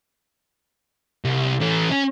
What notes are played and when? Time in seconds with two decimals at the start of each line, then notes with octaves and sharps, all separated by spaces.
1.25 C2
1.61 E3 A3
1.91 C#4